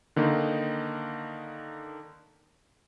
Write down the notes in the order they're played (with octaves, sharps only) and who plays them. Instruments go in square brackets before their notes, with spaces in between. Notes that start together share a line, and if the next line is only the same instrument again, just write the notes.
[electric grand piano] D3 D#3 A#3 D#4